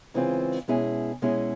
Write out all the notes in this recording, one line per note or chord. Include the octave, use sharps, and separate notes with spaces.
C#3 E3 G#3 C4 F4
B2 G#3 C#4 E4 G#4
B2 G#3 C#4 E4 G#4